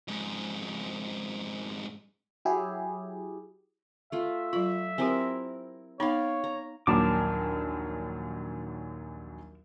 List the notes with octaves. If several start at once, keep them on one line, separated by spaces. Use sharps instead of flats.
F2 G#2
F#3 E4 G4 G#4
A3 F4 E5
F#3 F4 B5
C4 E4 G4 A#4 G#5
B3 D#4 C#5 D5 F5 B5
A#5
A#1 D#2 F#3 A#4 A5 D6